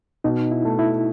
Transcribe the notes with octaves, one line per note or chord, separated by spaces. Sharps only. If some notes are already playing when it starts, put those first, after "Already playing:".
B2 D#4
E4
A3
E4